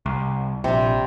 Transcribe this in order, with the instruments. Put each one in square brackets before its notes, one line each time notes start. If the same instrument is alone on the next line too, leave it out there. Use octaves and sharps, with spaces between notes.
[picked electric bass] C2
[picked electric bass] A#1 [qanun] C3 G3